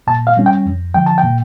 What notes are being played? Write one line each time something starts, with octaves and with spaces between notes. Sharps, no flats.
A#2 A5
F5
G3 C#4
G5
F2
D3 F3 G5
A5
G5
A#2